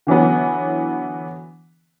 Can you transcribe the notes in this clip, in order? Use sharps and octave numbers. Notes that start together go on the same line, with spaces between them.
D3 E3 F#3 B3